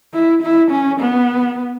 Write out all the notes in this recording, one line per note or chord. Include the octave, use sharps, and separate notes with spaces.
E4
E4
C#4
B3